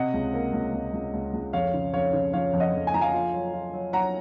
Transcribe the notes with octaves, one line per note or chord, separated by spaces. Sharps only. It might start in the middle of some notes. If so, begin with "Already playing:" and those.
Already playing: C3 D#5 F#5
C#2
A#3
C#2
C#2
C#2
C#2
C#2
F2 C#5 F5
C#3
F2 C#5 F5
C#3
F3 C#5 F5
F2
D#5 F#5
F2
G#5
F3 A#5
F5 G#5
F4
F#3
F4
F#3
F#3 F#5 A#5